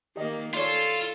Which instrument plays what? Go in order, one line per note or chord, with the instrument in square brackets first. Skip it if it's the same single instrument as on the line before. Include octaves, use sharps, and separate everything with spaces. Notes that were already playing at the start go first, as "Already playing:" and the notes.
[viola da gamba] D#3 A#3 [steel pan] G4 D#5
[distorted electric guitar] F4 [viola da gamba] A4 [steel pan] C#5 D5 C6